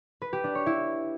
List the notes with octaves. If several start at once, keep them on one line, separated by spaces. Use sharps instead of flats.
B4
G4
D4
C#5
E4